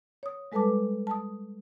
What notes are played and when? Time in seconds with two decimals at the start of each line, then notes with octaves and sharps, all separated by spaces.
0.23 C#5 D#6
0.52 G3 G#3 A4 B4 A5 D6
1.07 A5 D#6